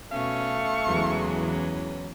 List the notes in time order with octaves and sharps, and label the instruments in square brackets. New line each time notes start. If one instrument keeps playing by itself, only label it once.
[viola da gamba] B2 C#4 [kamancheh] A3 C#6 [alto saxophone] F5
[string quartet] E2 E3 F#3 [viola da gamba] C#3 G#3
[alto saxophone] C#4